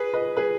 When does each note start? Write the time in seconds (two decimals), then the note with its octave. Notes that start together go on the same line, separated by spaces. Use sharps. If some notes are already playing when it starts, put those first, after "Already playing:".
Already playing: G#4 B4
0.13 B4 D#5
0.37 G#4 B4